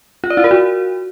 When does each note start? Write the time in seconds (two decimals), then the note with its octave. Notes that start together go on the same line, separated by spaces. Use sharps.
0.24 F4
0.30 D5
0.37 E4
0.44 A#4
0.51 F#4